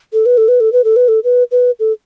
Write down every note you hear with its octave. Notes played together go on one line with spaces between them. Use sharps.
A4
B4
A4
B4
A4
B4
A4
B4
A4
B4
B4
A4